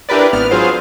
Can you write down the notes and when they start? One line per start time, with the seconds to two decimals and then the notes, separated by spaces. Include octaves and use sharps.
0.09 D4 E4 G4 A#4 B4 D5
0.33 G#1 B3 F6
0.51 F#3 F4 G#4 C5 F5